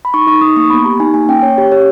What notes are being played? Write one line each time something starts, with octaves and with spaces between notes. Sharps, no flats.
B5
D#4 C#6
D#4 C#6
D#4 D#6
A#3 C#6
B3 B5
G4 A#5
D#4 G#5
A#3 G#5
C#4 G5
C#4 C#5
G4 C#5
G4 C#5